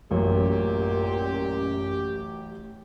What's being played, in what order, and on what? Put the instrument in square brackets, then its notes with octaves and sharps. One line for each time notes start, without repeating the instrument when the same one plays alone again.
[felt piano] A1 F#3 C#5 [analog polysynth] F#2 [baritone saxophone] A#2 [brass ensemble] G4